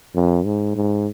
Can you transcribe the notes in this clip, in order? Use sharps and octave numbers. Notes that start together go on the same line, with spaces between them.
F2
G#2
G#2